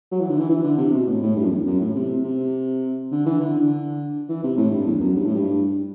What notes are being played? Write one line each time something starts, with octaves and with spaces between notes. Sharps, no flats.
F#3
E3
D3
E3
E3
D3
C3
B2
A2
A2
G2
F#2
E2
F#2
A2
C3
C3
D3
E3
D3
D3
E3
C3
A2
G2
E2
F#2
G2
A2
G2